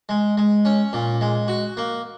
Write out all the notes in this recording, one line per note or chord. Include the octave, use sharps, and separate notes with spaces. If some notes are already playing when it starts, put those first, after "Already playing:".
G#3
G#3
C#4
A#2
G#3
F#4
A#3